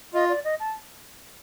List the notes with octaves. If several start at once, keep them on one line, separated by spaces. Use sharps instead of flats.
F4 D#5
D5
D#5
A5